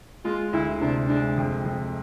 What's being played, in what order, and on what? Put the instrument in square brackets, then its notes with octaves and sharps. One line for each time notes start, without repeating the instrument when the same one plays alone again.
[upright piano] G#3 [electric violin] F4
[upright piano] D2 [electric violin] E4
[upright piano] C3 [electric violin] D4
[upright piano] G#3 [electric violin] D4
[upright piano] F2
F2